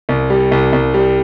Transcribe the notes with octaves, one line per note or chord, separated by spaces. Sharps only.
C2
G3
C2
C2
G3